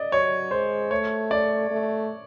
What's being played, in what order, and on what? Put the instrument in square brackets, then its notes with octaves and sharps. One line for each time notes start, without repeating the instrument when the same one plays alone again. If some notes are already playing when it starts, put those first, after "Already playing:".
Already playing: [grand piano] D5 D#5
[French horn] F#3 [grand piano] C#5
[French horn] G#3 [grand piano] C5
[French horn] A3 [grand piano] C#5
[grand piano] D5
[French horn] A3